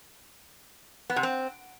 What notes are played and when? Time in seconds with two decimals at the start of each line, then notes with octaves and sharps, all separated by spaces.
1.10 B3
1.16 C3
1.23 C4